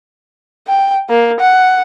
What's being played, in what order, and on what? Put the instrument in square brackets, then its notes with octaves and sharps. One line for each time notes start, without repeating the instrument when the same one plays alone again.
[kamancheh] G5
A#3
F#5